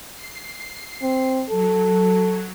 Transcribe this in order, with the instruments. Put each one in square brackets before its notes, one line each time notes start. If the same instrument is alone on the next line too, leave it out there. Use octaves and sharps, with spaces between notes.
[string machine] C7
[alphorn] C4
[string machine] F#3 [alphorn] A4